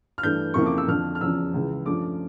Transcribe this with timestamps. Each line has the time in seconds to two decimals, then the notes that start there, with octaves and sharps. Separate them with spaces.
0.18 F6
0.23 G2 E3 A3 G6
0.54 F2 C#3 F3 A#3 E4 C#6
0.66 D6
0.78 E6
0.88 F2 D3 F3 F6
1.15 F6
1.21 E2 C#3 F3 C#4 E6
1.53 C#2 C#3 E3
1.86 G2 F3 A3 C#4 D6